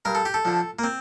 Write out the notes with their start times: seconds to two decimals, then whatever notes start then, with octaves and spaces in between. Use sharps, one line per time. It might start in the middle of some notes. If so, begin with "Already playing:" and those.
0.05 G2 A#4
0.15 A4
0.25 G4
0.34 A4
0.45 D3 F3
0.79 A#3
0.84 C4